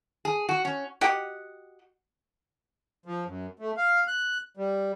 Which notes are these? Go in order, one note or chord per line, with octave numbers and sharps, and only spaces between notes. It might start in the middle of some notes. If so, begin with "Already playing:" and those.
G#4
F#4
C#4
F#4 G4 D#5 F#5
F3
F#2
A3
F5
F#6
G3